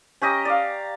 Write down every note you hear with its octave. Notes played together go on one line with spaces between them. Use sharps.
C#4 G4 D#5 A#5
D5 F5